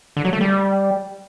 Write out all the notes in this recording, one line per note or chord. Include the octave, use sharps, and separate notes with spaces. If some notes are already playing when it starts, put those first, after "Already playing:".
D3
F#3
A3
G3